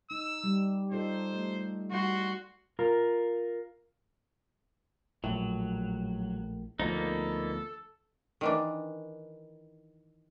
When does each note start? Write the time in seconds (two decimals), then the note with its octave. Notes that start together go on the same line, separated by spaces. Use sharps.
0.11 D#4 E6
0.44 G3
0.92 D#4 F4 A4 C5
1.33 A3
1.92 G3 F#4 C6
2.79 F4 A#4
5.24 A#1 A2 F#3
6.80 D2 F3 A#3 B3 D#4 A4
8.41 D#3 E3 D4